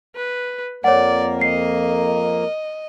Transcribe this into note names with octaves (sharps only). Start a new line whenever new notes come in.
B4
F2 A#3 A#4 C#5 D5 F#5
D#5 C7